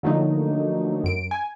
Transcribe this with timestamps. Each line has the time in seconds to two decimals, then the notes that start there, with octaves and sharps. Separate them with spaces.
0.03 D3 F3 F#3 A3 A#3 D#4
1.04 F#2 D7
1.31 G#5